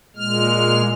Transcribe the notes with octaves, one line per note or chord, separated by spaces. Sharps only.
A#2 G#3 F6